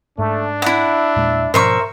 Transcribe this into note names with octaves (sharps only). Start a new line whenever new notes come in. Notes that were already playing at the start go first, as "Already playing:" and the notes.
G#2 A3 D4
E4 E5 F#5
E2 A#2 G#3
G#2 B2 F3 A#4 C5 E5 C#6